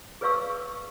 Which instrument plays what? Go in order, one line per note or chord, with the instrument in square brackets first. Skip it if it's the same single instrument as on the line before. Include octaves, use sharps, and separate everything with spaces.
[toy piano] G#4 B4 D5 F5 C#6 E6